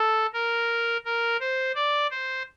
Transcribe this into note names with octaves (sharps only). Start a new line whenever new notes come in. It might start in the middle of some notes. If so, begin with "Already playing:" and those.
Already playing: A4
A#4
A#4
C5
D5
C5